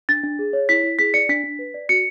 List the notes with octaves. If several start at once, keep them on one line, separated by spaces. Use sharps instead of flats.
D4 A6
D4
G#4
C#5
E4 B6
E4
G#4 B6
D5 C#7
D4 B6
D4
B4
D5
F#4 C#7